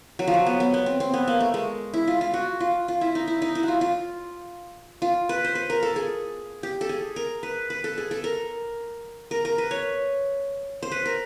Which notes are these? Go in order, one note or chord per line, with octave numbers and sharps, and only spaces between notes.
F#3
F3
F#3
B3
B3
B3
C4
C4
B3
A#3
A3
G#3
E4
F4
F4
F#4
F4
F4
E4
D#4
E4
D#4
E4
F#4
F4
F4
F4
B4
C5
B4
A#4
A4
G#4
G4
A4
G#4
A#4
B4
B4
A4
G#4
A4
A#4
A#4
A#4
B4
C#5
C5
B4
A#4